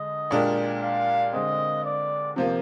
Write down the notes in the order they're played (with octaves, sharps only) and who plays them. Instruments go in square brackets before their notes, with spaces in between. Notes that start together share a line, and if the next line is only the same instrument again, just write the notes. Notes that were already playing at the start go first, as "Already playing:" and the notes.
Already playing: [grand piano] D3 G#3 [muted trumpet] D#5
[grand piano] A#2 G#3 D4 G4 A#4
[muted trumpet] F5
[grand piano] D3 G#3 C4 [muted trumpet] D#5
[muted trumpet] D5
[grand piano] C3 F3 A#3